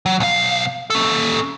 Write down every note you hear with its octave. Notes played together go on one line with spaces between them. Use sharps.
F#3
B1 F5
C#4 A4